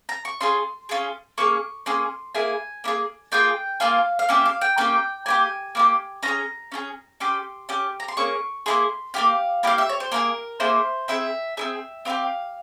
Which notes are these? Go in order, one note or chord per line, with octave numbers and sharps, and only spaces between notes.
A#5
C#6
C#4 F4 G#4 C6
C#4 F4 G#4
A#3 C#4 G#4 C#6
A#3 C#4 G#4 C6
A#3 E4 G#4 G#5
A#3 E4 G#4
A#3 F4 G#4 G5
A#3 F4 G#4 F5
F5
A#3 C#4 G4 E5
F5
G5
A#3 C#4 G4 G5
A#3 E4 G4 G#5
A#3 E4 G4
C#4 F4 A#5
G#4
C#4 F4 G#4
C#4 G4 C6
C#4 G4
A#5
C6
A#3 C#4 G#4 C#6
A#3 C#4 E4 G#4 C6
A#3 E4 G4 F5
A#3 E4 G4 F5
E5
C#5
C5
A#3 E4 G#4 A#4
A#3 E4 G#4 C5
C4 E4 G#4 E5
C4 E4 G#4 E5
C4 E4 G4 F5